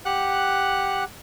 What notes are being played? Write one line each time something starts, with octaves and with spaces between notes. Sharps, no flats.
G4 F#5 F#6